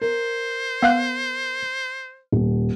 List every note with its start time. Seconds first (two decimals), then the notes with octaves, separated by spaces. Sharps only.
0.02 A#4 C5
0.83 B3 F5 F#6
2.32 D#1